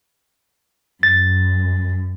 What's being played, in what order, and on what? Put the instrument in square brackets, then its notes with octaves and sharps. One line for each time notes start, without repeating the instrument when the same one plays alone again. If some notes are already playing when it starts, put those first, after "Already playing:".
[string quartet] F#2 [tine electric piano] A6